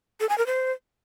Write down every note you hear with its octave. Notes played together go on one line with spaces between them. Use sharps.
A4
G#5
A#4
C5